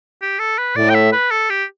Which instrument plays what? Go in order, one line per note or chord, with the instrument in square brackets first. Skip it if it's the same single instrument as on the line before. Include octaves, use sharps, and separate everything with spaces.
[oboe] G4
A4
B4
[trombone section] A2 [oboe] D5
[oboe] G5
E5
B4
A4
G4